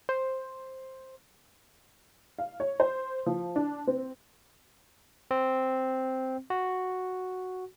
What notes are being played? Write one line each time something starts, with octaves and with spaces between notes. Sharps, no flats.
C5
F5
C#5
C5
F3
D4
C4
C4
F#4